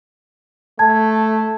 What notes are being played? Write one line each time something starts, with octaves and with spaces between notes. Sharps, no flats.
A3 A5 G#6